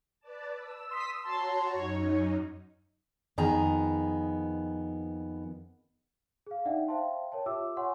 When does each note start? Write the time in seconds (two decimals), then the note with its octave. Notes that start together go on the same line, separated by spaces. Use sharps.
0.20 B4 D5 A5
0.53 E6
0.91 C6 D#6 B6
1.24 F#4 C#5 A5 A#5 C6
1.73 F#2 D#4 C#5
3.38 F2 D#3 B3 G#4 A#5
6.47 G#4 F5
6.65 D4 D#4 D5 E5 F#5 G5
6.88 C5 E5 F5 G5 A5 C6
7.32 A#4 C#5 G5 A5
7.46 F4 G4 E5 D6 E6
7.77 C#5 F#5 G#5 C6 C#6